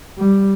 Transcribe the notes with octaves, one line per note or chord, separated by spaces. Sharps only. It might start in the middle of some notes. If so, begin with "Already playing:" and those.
G3